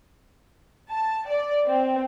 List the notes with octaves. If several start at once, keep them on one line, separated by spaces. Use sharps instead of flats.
A5
D5
C4